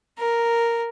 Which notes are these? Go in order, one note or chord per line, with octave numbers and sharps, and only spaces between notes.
A#4